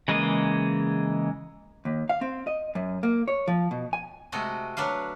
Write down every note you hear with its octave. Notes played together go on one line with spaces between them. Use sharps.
C#3 E3 G#3 A#3 D#5
D#2
F5
C4
D#5
F#2
A#3
C#5
F3
B2
G#5
C3 G#3 A3 F#4 A#5
F#3 D4 B4 F5